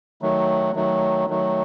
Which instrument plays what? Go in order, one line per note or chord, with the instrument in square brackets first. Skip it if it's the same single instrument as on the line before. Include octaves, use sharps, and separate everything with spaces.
[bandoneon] D#3 F#3 A3
D#3 F#3 A3
D#3 F#3 A3